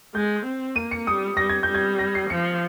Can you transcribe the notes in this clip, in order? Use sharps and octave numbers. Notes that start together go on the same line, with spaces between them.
G#3 G6
C4
A#3 D#7
C#7
G3 D#6
G3 A#6
G#6
G6
G3
G#6
A#6
C7
F3 C#7